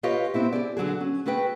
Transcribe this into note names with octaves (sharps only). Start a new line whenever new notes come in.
F4 G4 B4 C#5 D#5 F5
B3 C4 E4 G4
G4 G#4 D5
D3 F#3 F#4 G#4
C#4
A3 F#4 G#4 B4 G5